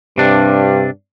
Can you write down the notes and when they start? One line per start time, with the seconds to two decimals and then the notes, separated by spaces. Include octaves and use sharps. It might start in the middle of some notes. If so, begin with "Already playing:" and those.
0.18 G2 C3 D4